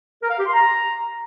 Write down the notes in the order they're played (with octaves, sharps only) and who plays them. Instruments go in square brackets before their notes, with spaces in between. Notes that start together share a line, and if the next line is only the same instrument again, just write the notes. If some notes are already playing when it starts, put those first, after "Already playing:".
[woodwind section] A#4
F5
G4
C6
A#5